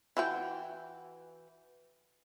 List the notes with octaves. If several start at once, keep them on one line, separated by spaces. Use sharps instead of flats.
E3 F#4 G5